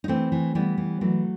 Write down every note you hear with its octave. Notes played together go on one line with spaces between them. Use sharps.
D#4
E3 A3 C4
E3
E3 G3 B3
E3
E3 F#3 A3